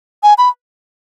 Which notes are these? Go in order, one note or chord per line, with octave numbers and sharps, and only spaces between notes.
G#5
B5